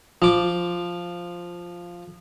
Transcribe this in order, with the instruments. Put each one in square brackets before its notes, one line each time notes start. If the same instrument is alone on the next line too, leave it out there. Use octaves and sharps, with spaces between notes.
[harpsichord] F3 D6